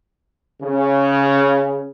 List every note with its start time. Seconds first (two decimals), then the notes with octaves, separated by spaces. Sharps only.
0.62 C#3